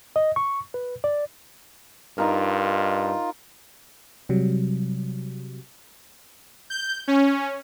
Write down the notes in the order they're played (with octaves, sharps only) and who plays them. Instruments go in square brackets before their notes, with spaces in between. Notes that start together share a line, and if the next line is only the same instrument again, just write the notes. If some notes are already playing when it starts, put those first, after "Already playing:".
[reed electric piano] D#5
C#6
B4
D5
[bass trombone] G2 [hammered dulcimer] D#4 A#4 [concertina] F4
[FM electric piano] C3 F#3 G3
[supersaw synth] G6
C#4